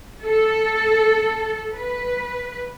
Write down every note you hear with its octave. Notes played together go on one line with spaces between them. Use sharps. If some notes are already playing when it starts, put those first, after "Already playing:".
A4
B4